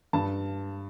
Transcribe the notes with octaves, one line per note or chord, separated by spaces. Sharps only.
G2 A5